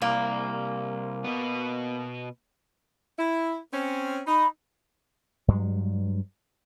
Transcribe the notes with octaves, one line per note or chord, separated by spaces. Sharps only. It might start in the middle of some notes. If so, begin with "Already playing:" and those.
C2 A#3
B2 B3
E4
C4 C#4
D#4 B5
G2 F#3 G#3